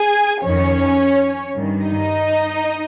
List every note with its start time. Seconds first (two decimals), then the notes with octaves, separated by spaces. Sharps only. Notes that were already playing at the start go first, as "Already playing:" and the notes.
Already playing: G#4 G#5
0.43 F2 D#3 C#4 C#5
1.56 G2 D#3
1.84 D#4 D#5